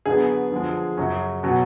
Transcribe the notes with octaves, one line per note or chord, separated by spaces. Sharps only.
D3 F#3 B3 G#4
D3 F3 G#3
F#2 C#3 F#3 C#4
B2 F#3 C#4